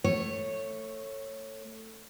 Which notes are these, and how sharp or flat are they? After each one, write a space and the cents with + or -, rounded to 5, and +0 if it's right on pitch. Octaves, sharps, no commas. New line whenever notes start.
A3 +20 C#5 -15